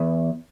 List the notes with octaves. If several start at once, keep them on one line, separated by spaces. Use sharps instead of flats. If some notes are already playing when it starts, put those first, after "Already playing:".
Already playing: E2